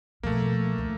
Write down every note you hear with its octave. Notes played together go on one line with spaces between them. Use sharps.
B2 F3 A3 A#3
D2 D#3